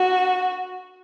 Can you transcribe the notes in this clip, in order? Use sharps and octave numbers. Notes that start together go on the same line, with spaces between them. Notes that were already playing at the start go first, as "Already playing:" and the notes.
Already playing: F#4